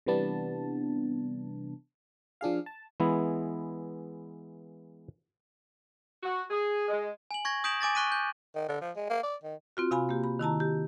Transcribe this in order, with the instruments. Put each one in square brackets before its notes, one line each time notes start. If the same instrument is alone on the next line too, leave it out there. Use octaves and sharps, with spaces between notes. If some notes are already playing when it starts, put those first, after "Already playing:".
[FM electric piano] C3 E3 G3 B3 D4 A5
F3 D4 G#4 F5
A5
[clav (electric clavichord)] E3 G#3 B3 E4
[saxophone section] F#4
G#4
G#3
[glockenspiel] G#5 F#7
C#6 G#6 A#6
D#6 G6 B6 D7 E7 F#7
G#5 D6 A6 A#6
C#6 F#6 B6 D#7
G6
[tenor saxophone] D#3
D3
F3
G#3
A#3
D5
D#3
[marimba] C4 F4 F#4
C3 F5 G#5 B5
A#3 G4
B5
D#3 E4 A5 A#5
G4